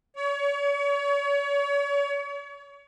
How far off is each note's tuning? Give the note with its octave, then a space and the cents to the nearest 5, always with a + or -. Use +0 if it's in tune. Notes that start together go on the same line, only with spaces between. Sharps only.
C#5 +35